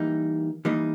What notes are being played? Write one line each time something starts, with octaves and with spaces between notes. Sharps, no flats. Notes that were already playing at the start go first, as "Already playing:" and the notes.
Already playing: E3 G3 A#3 D#4
E3 G3 A#3 D#4